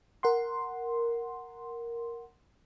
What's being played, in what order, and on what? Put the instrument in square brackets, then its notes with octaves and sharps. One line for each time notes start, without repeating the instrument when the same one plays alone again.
[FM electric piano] A#4 F#5 C6